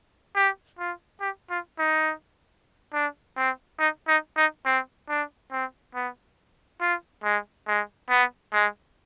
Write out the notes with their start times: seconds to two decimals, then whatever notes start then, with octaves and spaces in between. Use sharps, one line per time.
0.35 G4
0.78 F4
1.20 G4
1.50 F4
1.78 D#4
2.93 D4
3.36 C4
3.79 D#4
4.08 D#4
4.37 D#4
4.65 C4
5.09 D4
5.52 C4
5.95 B3
6.81 F4
7.24 G#3
7.67 G#3
8.10 B3
8.53 G#3